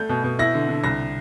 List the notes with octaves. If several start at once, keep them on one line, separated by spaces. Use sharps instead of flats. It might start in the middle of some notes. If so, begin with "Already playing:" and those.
Already playing: A3 G6
B2
B2
E4 A#6
D3
D3
C2 A#6